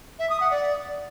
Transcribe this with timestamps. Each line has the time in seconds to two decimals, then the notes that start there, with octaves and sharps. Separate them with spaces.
0.19 E5
0.30 D#6
0.40 F#5
0.51 D5